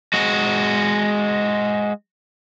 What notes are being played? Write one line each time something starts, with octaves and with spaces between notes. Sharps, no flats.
G#3 F#4